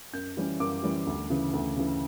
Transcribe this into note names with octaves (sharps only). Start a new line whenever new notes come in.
F#2 G6
E3 G3 C#4
F#2 D6
E3 G3 C#4
D2
C#3 E3
D2
C#3 E3